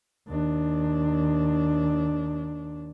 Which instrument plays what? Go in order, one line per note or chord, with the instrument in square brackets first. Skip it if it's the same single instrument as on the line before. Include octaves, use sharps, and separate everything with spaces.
[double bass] D#2 D4